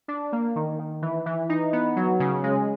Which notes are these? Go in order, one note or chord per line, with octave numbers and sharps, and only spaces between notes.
D4
A#3
D#3
D#3
E3
E3
D#4
B3
F#3
C#3
G#3